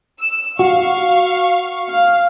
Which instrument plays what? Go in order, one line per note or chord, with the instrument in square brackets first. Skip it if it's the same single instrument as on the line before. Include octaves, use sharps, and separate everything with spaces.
[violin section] E6
[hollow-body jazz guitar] F#4 [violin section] F5 C#6
[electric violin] F5